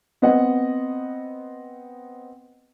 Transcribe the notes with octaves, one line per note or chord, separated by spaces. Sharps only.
B3 C4 D#5 F#5